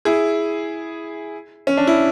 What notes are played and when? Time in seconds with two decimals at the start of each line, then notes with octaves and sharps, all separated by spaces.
0.05 E4 G#4
1.67 C#4
1.77 D4
1.87 E4